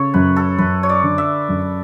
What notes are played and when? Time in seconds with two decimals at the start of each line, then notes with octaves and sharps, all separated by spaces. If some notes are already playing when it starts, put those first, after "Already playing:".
Already playing: C#3 A4 C#5
0.14 F#2 B4
0.36 A4
0.58 F#2 B4
0.83 C#5
0.89 D5
1.03 D3
1.18 E5
1.49 F#2